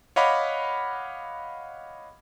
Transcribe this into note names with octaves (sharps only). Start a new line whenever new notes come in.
C#5 D#5 F5 F#5 B5 D6